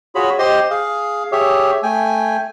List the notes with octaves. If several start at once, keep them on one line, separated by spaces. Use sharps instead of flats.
F4 F#4 G#4 C#5 B5
G4 C5 D#5 C6
G#4 F5
G4 G#4 C#5 E5
A3 G5 G#5